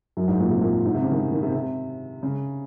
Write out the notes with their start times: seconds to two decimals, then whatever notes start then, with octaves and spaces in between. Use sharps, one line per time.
0.17 F#2
0.28 G#2
0.40 A#2
0.50 C3
0.61 A#2
0.85 G#2
0.94 C3
1.02 C#3
1.11 D#3
1.31 D#3
1.42 C3
1.55 C3
2.23 C#3